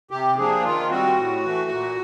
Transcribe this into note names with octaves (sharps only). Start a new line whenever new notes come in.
C3 G4
F3 A#3 D4 G#4
D#3 F4
G3 C4 F#4
A2
E3 A3
A#2